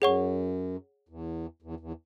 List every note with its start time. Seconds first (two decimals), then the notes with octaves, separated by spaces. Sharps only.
0.01 F#2 G#4 C#5 F#5 C#6
1.09 E2
1.62 E2
1.80 E2